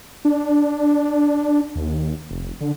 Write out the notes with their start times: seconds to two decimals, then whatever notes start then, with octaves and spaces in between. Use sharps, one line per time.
0.25 D4
1.75 D#2
2.30 F1
2.61 D3